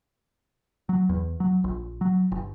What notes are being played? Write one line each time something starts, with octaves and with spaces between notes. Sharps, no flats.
F#3
E2
F#3
A#1
F#3
G1